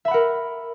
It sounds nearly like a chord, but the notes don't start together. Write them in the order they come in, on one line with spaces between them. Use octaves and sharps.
E5 B5 F#5 A#4